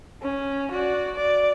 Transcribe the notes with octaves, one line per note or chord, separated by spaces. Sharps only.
C#4
F#4 D5
D5